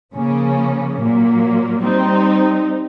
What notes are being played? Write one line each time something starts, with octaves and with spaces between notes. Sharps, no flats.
C#3 F3 A#3 C#4
A#2 F#3 A#3
G3 C4 D#4